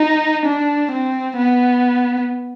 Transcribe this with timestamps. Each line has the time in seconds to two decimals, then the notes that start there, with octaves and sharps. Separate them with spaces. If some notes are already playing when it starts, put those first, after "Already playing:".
Already playing: D#4
0.46 D4
0.91 C4
1.37 B3